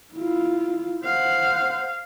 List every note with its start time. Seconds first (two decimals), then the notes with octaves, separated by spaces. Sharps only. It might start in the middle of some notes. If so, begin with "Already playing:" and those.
0.14 E4 F4
1.04 C5 F5 F#5